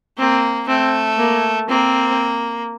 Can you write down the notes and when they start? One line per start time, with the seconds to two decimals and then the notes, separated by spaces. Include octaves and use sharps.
0.18 A#3 C4
0.68 A3 C4
1.18 A#3
1.69 A#3 C4